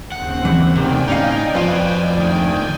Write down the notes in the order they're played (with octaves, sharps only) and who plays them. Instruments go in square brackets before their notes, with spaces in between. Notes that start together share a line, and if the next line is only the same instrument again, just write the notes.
[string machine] D#2 C#3 C4 [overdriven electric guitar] F#5
[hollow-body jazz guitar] E3
[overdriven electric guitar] D2 D#3 [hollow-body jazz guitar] C3 [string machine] D5 G5 G#5
[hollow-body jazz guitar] A2 C#4 F5 [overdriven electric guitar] D#4
[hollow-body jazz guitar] F2 F4 [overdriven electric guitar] B4 D#5
[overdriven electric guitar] D2 D#3